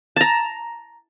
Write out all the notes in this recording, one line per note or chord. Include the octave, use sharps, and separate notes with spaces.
A5 A#5